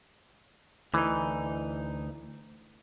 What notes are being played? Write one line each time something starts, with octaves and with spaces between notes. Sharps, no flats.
D2 E3 D#4